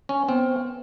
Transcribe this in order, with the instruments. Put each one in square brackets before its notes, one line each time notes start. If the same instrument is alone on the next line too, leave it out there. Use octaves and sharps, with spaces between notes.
[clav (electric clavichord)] C#4
[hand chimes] B3 [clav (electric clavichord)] C4